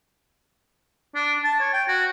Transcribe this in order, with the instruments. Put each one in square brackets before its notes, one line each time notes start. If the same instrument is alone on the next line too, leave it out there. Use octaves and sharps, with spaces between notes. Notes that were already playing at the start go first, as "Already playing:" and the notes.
[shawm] D4
A5
C#5
G5
F#4